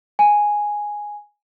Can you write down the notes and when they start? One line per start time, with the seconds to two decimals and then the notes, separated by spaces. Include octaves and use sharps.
0.19 G#5